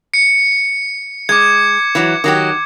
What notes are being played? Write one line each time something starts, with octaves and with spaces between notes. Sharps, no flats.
C#7
G#3 D6 G#6
E3 F#3
D#3 F#3 G4